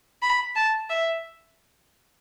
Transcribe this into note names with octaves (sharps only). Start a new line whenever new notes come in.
B5
A5
E5